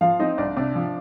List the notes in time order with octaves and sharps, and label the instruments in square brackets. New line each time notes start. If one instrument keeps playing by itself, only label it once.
[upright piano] F3 F4 F5
C4 D#4 D#5
C2 D4 D5
C3 D4 D5
F3